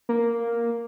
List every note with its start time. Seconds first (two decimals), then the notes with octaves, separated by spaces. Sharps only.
0.09 A#3